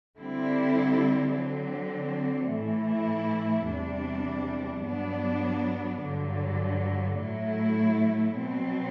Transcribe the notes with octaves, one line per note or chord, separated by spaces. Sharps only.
D3 G3 C4 E4
D3 F#3 C4
A2 E3 A3 E4
E2 C3 G3 D4
G2 F#3 B3 D4
G2 D3 F#3
A2 F#3 A3 E4
B2 F#3 C4